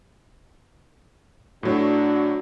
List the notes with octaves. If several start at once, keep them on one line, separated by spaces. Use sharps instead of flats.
A2 F#3 D4 F#4 C#5